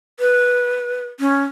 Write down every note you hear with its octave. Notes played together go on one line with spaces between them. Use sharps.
B4
C#4